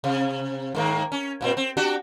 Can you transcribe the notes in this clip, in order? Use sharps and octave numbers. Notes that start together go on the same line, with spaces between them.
C3
G#2 D#3 A#3
C#4
G2 A#2 C4
C4
D4 F#4 G4